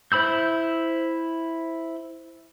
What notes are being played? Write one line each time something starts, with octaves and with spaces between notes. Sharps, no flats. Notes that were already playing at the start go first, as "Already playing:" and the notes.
E4 C5 B5 E6 G6